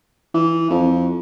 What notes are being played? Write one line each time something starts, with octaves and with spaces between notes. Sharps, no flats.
E3
F2